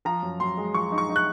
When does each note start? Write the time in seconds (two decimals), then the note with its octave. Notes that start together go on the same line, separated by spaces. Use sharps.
0.05 F3 A#5
0.22 F#2
0.40 F#2 C6
0.57 G#3
0.74 F3 C#6
0.92 D#4
0.98 C#6
1.10 D#4
1.16 F#6